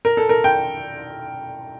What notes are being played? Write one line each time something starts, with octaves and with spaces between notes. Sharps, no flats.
A#4
A4
A#4
G5